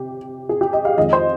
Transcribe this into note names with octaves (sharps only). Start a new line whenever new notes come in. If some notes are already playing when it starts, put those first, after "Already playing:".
Already playing: C3 G4
G#4
G4
D#5
F5
F2 D#3 G#3 D#5
C5